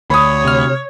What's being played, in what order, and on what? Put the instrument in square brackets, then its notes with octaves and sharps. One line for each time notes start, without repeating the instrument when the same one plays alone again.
[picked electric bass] D2 [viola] C#5 [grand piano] B5 D#6
[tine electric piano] C3 F6